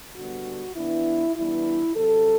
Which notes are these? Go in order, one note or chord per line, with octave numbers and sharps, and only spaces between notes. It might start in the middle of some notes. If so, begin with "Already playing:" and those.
D3 G3 B3 F#4
E3 B3 D4 E4
E3 G3 B3 D4 E4
C3 F#3 C4 A4